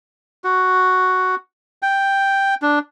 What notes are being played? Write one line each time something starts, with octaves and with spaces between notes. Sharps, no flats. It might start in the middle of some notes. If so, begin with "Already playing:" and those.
F#4
G5
D4